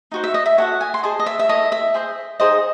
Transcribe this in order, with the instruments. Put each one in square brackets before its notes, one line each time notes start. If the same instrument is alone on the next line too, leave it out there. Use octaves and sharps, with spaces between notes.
[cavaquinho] D#4 F#4 C5
E5
D#5
E5
F#4 A4 C#5 F#5
G#5
C6
G#4 C5 D#5 A5
D#5
E5
E5
E4 A4 C#5 D#5
E5
G#4 C5 D#5
D#4 G#4 C5 D#5